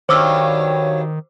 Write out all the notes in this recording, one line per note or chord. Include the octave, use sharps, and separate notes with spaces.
G2 D#3 F#3 C5 C#5 D6 E6